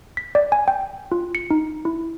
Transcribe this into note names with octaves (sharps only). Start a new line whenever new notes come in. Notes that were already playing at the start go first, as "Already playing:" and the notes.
B6
D5
G#5
G5
F4
C#7
D#4
E4